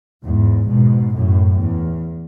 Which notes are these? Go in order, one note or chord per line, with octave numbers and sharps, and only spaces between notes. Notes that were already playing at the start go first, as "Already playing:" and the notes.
E2 G#2
G#2 B2
F#2 A2
E2